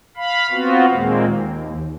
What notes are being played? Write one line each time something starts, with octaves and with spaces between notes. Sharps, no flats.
F5 B5
B3 C4 F4 F#4
D#2 A#2 G#3 A#3 C4
D#2